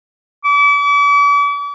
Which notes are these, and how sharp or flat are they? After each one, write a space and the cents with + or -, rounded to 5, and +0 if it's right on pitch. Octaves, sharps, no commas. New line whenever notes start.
D6 -40